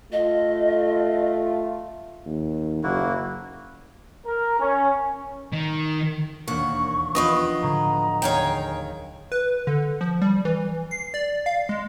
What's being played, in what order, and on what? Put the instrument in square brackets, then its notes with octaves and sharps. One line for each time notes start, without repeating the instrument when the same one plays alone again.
[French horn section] A3 F4 [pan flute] D#5
[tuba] D#2
[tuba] F#1 [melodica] A#3 E4 F#4
[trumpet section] A#4
C#4
[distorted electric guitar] D#3
[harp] E1 D#2 D4 [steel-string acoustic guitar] A#3 F#5 [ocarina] C#6
[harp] F3 D4 G4 [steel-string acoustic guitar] B3 F4 B4 [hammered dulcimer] D#5
[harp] A2 D3 F#3 [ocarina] A#5
[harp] D#2 A3 G#4 [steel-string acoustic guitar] C#5 F5 G5
[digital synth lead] B4
D3
F3
G3
E3
C7
D5
F5
G#3